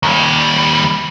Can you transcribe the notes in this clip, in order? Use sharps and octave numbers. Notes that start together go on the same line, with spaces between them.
D#2 G3